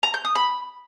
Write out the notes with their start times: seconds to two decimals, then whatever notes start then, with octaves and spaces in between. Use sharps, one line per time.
0.03 A#5
0.14 G6
0.25 D#6
0.35 B5